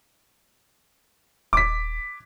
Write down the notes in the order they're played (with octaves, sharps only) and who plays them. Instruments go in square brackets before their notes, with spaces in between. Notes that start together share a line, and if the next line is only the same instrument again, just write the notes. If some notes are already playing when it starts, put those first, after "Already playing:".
[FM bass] D#1 [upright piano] D6 B6